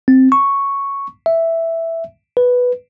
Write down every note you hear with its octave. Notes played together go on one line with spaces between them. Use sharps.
C4
C#6
E5
B4